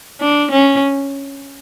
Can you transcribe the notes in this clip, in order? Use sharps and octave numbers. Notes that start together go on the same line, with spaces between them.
D4
C#4